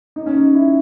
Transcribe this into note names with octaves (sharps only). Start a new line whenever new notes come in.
D#4
C#4
D#4
E4